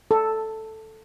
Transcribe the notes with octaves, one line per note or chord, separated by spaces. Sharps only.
A4